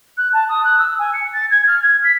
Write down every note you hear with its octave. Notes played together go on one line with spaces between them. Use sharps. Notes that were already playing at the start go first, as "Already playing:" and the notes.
F#6
A5
D#6
F#6
E6
G#5
C#7
A6
G#6
F6
G#6
B6